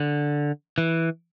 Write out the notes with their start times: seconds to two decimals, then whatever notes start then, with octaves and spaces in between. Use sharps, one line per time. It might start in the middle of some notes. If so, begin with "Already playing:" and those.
Already playing: D3
0.78 E3